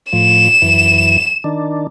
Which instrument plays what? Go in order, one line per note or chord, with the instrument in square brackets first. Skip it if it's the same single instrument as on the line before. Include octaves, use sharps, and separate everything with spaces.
[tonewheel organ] A2 F3 [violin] E7
[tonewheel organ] F#2 E3
D#3 D4